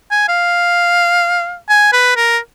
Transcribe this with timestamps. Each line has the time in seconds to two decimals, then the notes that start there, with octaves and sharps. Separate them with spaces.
0.12 G#5
0.29 F5
1.69 G#5
1.93 B4
2.17 A#4